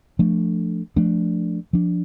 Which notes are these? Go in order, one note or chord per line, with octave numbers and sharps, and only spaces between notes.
F3 A3 D4
F3 A3 D4
F3 D4